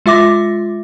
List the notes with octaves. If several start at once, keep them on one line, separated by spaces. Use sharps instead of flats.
G#3 F4 E5 D6 A#6